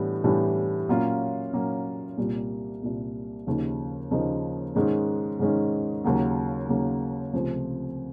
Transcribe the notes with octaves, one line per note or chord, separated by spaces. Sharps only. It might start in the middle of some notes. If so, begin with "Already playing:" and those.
Already playing: A2 E3 G3 B3 D4
A2 E3 G3 B3 D4
A#2 F#3 A#3 C#4 F4
A#2 F#3 A#3 C#4 F4
C2 A#2 G3 A#3
C2 A#2 G3 A#3
D#2 C#3 F3 A#3 D#4
D#2 C#3 F3 A#3 D#4
G#2 D#3 G#3 C#4
G#2 D#3 G#3 C#4
D#2 C#3 F#3 A#3
D#2 C#3 F#3 A#3
C#2 C3 F3 A3 C4